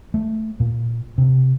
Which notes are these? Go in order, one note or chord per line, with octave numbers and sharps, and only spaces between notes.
A3
A#2
C3